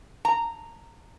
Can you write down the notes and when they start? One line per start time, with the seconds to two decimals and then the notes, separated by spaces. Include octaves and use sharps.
0.25 A#5